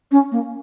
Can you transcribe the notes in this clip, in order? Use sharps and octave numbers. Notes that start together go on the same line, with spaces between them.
C#4
A#3